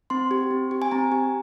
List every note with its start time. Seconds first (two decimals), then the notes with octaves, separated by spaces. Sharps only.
0.10 C4 C6
0.31 G4
0.51 C4
0.71 G4
0.82 G#5
0.91 C4 A#5
1.12 G4